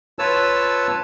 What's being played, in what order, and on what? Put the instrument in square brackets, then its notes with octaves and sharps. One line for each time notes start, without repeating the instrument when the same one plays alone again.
[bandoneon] F4 B4 C#5 A5 E6